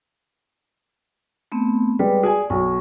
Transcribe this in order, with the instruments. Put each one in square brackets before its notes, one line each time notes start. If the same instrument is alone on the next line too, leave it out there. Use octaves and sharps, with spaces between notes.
[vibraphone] A3 B3 C4
[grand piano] G3 G#3 [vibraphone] B4
[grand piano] G#4 G#5 [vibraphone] D5
[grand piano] B1 [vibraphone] C#6